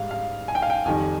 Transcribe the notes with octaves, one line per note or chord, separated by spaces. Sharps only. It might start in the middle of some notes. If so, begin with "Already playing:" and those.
Already playing: G#2 G3 F5
F5
G#5
G5
F5
G5
F2 D#3 G3 G#5